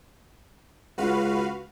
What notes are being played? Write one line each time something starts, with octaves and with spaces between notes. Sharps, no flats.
C#2 F#4 B4 F5